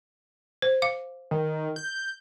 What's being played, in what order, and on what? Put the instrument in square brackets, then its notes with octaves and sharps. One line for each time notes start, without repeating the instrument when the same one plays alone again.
[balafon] C5
F5 D6
[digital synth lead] D#3
G6